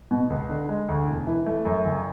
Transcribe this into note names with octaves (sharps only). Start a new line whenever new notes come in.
B2
C#2
D3
G#3
D2
E1
E3
A3
F#2
F#1